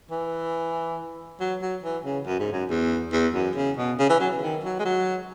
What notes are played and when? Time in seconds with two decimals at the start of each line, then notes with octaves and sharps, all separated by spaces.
0.11 E3
1.40 F#3
1.62 F#3
1.84 E3
2.05 C#3
2.26 F#2
2.39 G#2
2.52 F#2
2.70 E2
3.12 E2
3.34 F#2
3.56 C#3
3.77 B2
3.99 C#3
4.09 E3
4.20 F#3
4.42 D#3
4.64 F#3
4.79 G#3
4.85 F#3